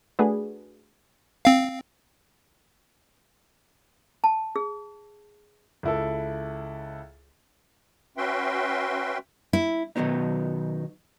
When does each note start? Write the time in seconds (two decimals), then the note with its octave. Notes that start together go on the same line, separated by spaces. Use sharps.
0.19 A3 D4 F#4 G#4 B4
1.45 C4 F5
4.24 A5
4.56 G#4
5.83 C#2 E4 A4
8.17 C#4 F#4 B4 E5 G5 C6
9.53 E4
9.96 B2 D#3 F#3 B3 D#4